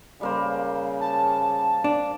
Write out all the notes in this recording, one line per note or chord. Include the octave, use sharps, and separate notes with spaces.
C#3 G3 A#3 C5
A5
D4